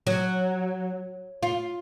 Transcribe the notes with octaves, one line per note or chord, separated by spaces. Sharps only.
F#3
F4